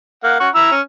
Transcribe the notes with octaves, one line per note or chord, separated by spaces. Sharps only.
A#3 F5 F#5
C#4 F#5 C#6
E4 A#5 E6
C#4